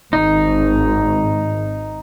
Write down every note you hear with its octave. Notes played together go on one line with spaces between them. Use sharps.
G#1 D#4